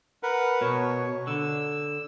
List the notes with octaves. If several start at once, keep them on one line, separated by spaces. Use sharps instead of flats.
A#4 B4 F#5
B2 C#5
D3 E6